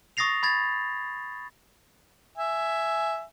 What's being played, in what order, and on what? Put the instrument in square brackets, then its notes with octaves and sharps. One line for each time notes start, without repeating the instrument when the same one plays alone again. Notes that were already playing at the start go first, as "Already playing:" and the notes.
[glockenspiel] C#6 D#6 A6 A#6 C7 F7
B5 G#6 A6
[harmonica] E5 G#5